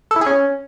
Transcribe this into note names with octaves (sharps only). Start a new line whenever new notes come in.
A4
E4
G#4
C#4